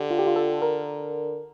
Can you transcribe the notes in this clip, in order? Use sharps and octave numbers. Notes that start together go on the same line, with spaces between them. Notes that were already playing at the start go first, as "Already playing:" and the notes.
Already playing: D3 G4
F4
G4
F4
A4
A#4